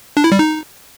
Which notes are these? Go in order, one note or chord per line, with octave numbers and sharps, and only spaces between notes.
D4
E4
G3
D#4